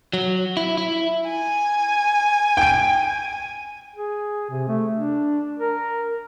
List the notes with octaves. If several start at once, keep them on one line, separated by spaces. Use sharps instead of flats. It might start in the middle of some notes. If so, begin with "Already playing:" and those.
F#3
E4
E4
G#5
G5 D7
G#4
C3
A3
D4
A#4